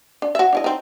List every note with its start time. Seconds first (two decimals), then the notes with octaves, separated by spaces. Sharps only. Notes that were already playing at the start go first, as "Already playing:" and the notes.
0.22 D4
0.35 F#4 E5
0.53 D4 E4 D#5
0.64 C4 D#4